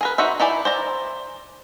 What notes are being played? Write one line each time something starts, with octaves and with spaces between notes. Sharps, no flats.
G#4 A#4 B4
D#4 F#4 C5 E5
D#4 E4 D5 G#5
C5 D5 A#5